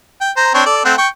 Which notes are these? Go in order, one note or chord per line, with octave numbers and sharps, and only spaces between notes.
G5
C5 A#5
C4 D4 C#5
A4 D5
A3 C4 F#5
G5 C#6